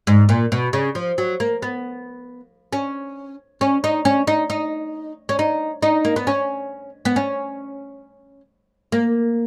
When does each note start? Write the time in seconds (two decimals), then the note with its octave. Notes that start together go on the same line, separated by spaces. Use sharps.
0.07 G#2
0.29 A#2
0.52 B2
0.73 C#3
0.95 F3
1.18 F#3
1.40 A#3
1.62 B3
2.73 C#4
3.61 C#4
3.84 D#4
4.05 C#4
4.27 D#4
4.50 D#4
5.29 C#4
5.39 D#4
5.82 D#4
6.05 A#3
6.16 B3
6.27 C#4
7.05 B3
7.16 C#4
8.92 A#3